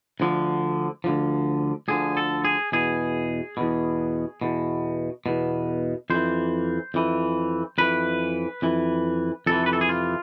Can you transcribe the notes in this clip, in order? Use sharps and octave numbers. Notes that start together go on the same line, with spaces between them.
D2 D3 F3
D2 D3 F3
D2 D3 F3 G#4
A4
G#4
E2 B2 G#4
E2 B2
E2 B2
E2 B2
F2 E3 C5
F2 E3
F2 E3 B4
F2 E3
F2 C3 E3 A4
B4
A4
G#4
F4